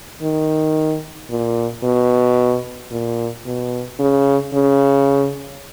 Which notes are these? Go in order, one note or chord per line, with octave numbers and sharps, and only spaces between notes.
D#3
A#2
B2
A#2
B2
C#3
C#3